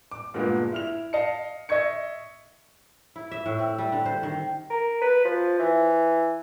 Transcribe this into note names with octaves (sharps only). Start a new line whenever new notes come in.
D6
G2 A#2 D3 G#3 B3
E4 F6 F7
D#5 F5 A5 C#7
D#5 E5 C#6 G#6 C#7
E4
E5
A2
C4
G3
D3
C5
D#3
A#4
B4
F3
E3